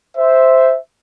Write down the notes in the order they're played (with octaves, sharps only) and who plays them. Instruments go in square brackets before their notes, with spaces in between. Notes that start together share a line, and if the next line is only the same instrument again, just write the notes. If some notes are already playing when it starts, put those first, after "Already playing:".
[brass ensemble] C5 E5